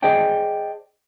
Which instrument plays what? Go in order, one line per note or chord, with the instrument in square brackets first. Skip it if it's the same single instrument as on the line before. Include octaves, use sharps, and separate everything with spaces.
[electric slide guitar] G#4 C5 D5 D#5 G5 A5